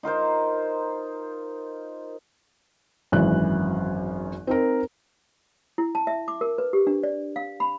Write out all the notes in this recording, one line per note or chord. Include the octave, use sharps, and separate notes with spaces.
D#4 F4 A#4 C5
G#1 F#2 E3 F#6
C4 D#4 A#4
E4
A5
E5
D6
A#4
B4
G4
D4
D5
F5
B5